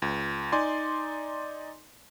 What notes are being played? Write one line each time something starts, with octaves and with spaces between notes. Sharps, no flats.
C#2
D#4 D5 G#5 C6